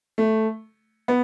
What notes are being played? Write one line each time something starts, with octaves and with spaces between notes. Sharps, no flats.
A3
B3